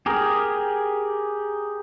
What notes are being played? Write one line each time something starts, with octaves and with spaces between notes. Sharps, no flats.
G4 G#4 A#4